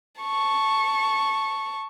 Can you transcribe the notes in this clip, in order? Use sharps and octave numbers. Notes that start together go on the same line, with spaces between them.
A5 C#6